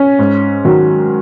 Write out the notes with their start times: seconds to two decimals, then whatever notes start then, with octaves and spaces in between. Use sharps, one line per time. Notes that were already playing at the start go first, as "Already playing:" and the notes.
Already playing: C#4
0.19 G#2
0.65 D#3 F#3